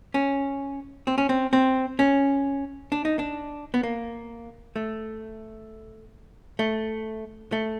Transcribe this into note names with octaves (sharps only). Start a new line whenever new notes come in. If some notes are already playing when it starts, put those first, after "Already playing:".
C#4
C4
C#4
C4
C4
C#4
D4
D#4
D4
B3
A#3
A3
A3
A3